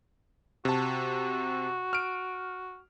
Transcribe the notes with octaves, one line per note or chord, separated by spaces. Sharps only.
C3 F#4 A5
F6 D7